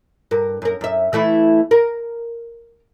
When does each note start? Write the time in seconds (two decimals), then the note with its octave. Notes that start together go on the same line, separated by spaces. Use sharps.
0.31 G2 A#4
0.62 F#2 A#4
0.81 F#2 E5
1.13 E3 A3 E4
1.71 A#4